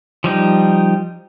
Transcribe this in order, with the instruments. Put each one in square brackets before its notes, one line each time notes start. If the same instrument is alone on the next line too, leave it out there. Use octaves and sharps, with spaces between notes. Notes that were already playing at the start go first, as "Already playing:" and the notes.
[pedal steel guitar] F3 G3 D#4